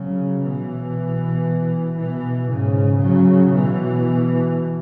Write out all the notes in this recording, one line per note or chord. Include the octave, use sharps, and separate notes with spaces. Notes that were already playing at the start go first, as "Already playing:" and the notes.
Already playing: C#3 F#3
B2 E3
B2 E3
G#2 C#3
C#3 F#3
B2 E3